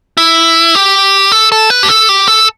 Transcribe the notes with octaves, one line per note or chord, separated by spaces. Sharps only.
E4
G4
A4
A4
B4
G4
A4
G4
A4